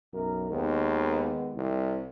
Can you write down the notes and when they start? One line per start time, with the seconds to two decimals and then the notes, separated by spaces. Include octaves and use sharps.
0.14 B1 F#2 A#4
0.51 D#2 D#3 G#3 B3
1.55 C2